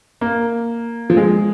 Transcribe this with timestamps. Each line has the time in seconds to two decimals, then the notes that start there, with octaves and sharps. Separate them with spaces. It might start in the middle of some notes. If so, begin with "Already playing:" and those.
0.21 A#3
1.10 F3
1.17 G#3